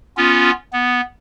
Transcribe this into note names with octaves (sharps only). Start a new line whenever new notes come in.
B3 C#4 F4
B3